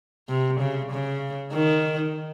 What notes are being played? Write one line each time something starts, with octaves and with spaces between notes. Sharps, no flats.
C3
C#3
C#3
D#3